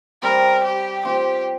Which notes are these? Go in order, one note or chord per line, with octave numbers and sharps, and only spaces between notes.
G3 C4 A#4
G4
C4 F4 G4